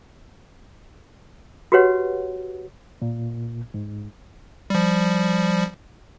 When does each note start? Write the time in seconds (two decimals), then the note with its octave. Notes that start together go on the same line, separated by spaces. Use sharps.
1.72 F#4 G4 B4 C#5 F#5
3.02 A#2
3.74 G#2
4.70 F3 G3